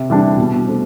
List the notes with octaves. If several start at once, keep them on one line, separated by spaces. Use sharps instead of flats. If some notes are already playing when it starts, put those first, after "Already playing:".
Already playing: C3
E3 G3 D4
B2
A3 C4